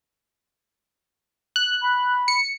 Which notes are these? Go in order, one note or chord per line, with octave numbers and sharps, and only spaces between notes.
F#6
B5
C#7